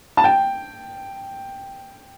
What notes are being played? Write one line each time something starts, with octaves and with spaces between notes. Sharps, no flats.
A5
G5